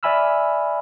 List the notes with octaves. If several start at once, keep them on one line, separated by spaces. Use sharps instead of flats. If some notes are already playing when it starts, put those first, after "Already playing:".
D5 E5 G#5 B5 E6 F6